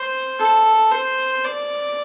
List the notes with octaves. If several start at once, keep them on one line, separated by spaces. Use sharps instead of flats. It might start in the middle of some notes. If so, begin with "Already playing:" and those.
Already playing: C5
A4
C5
D5